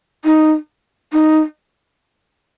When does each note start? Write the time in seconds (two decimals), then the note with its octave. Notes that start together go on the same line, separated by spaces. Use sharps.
0.25 D#4
1.13 D#4